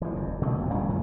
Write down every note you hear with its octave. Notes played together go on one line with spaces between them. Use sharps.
E3 F3
F#1 E2
B2 D3 A3
E1 F2 A#2
F#2 C#3 F#3 A3
F2 A#2 D3 E3